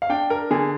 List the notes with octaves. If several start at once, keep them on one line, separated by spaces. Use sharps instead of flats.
F5
D4 G5
A#4
D3 G#4